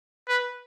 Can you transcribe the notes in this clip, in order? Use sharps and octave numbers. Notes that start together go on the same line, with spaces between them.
B4